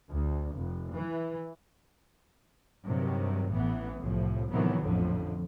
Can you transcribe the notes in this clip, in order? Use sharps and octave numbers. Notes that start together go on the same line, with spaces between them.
D2
F1
E3
G2 C3 D#3 F#3
A1 A2 E3 B3
C2 A2 F3
A2 C3 D#3 E3 F#3 B3
A1 F2 A2 D3 F3